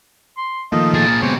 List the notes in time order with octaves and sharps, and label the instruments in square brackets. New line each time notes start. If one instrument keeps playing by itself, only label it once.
[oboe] C6
[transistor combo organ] D#3 F3 A3 [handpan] A#3 [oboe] D#5
[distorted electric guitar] A#2 G#4 [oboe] A5
[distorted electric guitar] B2 G4 [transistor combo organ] G#3 C4 [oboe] C#5